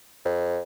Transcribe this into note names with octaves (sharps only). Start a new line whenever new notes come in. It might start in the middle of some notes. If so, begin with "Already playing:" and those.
F2